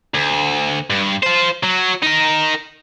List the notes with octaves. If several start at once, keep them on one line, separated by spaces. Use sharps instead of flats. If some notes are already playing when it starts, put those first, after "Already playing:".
D2
G2
F4 C5
F#3
D#4 A#4